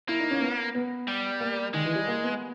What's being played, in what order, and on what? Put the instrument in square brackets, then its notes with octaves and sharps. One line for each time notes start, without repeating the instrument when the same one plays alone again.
[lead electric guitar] A#3 [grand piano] E4
[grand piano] D#4
C#4
B3
B3
[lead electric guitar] G3
[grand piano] A#3
[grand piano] D#3 [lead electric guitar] G#3
[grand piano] E3
G3
A#3
B3